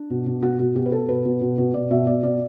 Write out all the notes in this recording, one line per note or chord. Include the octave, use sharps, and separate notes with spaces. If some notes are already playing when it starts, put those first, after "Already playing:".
Already playing: D4
B2
B2
B2 F#4
B2 F#4
B2 G4
B4
B2 A4
B2 B4
B2
B2
B2
B2 D5
B2 E5
B2 D5
B2 D5